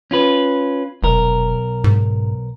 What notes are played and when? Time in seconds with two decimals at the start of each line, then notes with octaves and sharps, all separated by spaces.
0.11 C#4 F4 B4
1.03 F1 B1 A#4
1.84 G#2